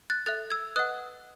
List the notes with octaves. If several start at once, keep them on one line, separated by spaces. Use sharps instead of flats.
F#6 A6
A4 E5 F#6 A6
E6 G#6
B4 D#5 F#5 D#6 F#6